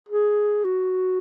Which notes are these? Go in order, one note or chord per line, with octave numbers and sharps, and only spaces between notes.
G#4
F#4